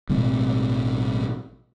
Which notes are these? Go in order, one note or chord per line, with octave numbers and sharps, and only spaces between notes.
A1 B2 G#3 C4